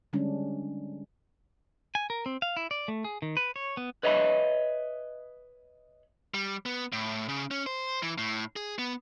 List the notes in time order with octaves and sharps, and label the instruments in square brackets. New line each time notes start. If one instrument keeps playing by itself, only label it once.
[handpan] D3 G3 G#3 C#4 D4
[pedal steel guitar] G#5
A#4
C4
F5
E4
D5
A3
G#4
D#3
B4
C#5
B3
[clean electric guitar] B4 C#5 D#5 E5 G#5 B5
[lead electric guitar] G3
B3
A2
C#3
C#4
C5
E3
A2
G#4
B3